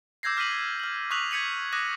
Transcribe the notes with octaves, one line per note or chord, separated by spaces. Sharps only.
D6 E6 G6 G#6 A#6 C7
D6 F6 B6 D#7 F#7
F6 F#7
C#6 D#6 F#6 B6 F7 F#7
G#6 B6 C#7 D#7 F#7
D6 D#6 F#6 A#6 D#7